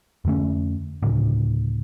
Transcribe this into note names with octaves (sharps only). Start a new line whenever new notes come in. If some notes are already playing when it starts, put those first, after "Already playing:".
F2 D3 A3 C#4
D2 A2 C#3